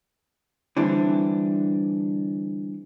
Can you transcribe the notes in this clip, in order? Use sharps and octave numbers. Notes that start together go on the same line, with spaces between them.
D3 E3 G3 C4 D4